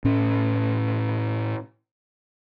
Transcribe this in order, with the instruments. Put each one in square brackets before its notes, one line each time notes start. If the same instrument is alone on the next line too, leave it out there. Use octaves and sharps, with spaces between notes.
[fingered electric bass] A2 C#4